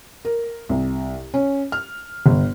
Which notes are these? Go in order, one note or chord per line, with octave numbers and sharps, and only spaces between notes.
A#4
C2
C#4
F6
G1